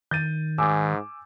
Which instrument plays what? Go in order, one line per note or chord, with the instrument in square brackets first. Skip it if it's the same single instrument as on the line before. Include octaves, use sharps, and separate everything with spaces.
[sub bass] D#3 [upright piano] G6 A6 D#7
[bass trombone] G#2 [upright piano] G#5 D6 E6